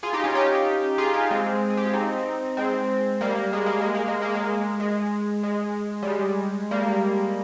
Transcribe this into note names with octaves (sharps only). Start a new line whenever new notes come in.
F4 G#4
D#4 G4
C#4 F4
D#4 G4
F4 G#4
D#4 G4
G#3 C4
G#4
G4
F4
C4 D#4
G#3 C4
G3 A#3
G#3
A#3
G#3
A#3
G#3
A#3
G#3
G#3
G#3
G3
G#3
G3 A#3